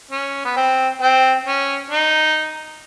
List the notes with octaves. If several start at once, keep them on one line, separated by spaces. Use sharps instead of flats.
C#4
B3
C4
C4
C#4
D#4